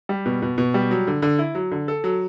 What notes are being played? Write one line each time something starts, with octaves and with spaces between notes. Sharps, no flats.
G3
B2
B2
B2
G3
F#3
D3
D3
E4
F#3
D3
A4
F#3